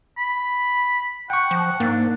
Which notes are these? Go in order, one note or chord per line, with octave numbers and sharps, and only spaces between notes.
B5
F#5 G5 C#6
F3
G#2 A#3 D4